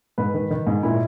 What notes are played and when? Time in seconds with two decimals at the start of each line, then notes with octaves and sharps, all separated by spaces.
0.18 G#2 B4
0.34 D#3
0.51 D#3
0.67 G#2
0.83 A#2 E4